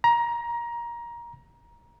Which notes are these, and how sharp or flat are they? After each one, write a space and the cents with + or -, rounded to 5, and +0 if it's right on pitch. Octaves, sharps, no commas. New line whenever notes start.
A#5 +20